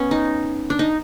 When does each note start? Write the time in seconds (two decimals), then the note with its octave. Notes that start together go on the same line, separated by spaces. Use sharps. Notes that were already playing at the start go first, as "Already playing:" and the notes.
Already playing: B3 C#4
0.11 D#4
0.70 D4
0.79 D#4